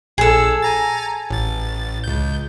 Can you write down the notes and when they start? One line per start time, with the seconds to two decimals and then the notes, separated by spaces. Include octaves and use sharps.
0.18 A#1 G#4 A4 E6
0.62 G#5 A#5 A6
1.30 A1 A6
2.04 C#2 G6